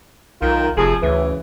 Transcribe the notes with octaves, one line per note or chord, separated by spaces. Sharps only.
B1 D#3 F4
F1 C3 F3 G#4
D2 C#3 E3